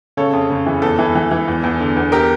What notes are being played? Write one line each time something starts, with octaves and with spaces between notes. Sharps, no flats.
C#3 A4 C#5
F2
C#3
E3
E2 A4
E3
E3
E3
E2
E2
D3
E2
G4 A#4